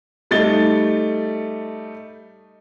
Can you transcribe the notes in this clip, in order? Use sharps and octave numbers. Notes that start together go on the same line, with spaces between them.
G3 A3 D#4 A6 C#7 G7